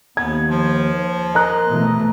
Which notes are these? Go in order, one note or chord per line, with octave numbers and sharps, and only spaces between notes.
D#2 B3 G#6
F3
A#4 D#5 A#5 F#6
B2 E3 A3